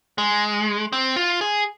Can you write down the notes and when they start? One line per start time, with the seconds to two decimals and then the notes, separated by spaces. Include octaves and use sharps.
0.18 G#3
0.93 C4
1.16 F4
1.41 G#4